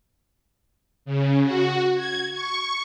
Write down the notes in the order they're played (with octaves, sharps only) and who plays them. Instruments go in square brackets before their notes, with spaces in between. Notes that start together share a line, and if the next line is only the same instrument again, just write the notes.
[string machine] C#3
F#4
G#6
C#6